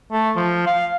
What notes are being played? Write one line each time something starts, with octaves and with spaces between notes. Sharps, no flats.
A3
F3
F5